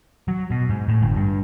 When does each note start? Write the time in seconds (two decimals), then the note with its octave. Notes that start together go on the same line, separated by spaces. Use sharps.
0.28 F#3
0.51 B2
0.69 G#2
0.88 A2
1.02 G1
1.16 G2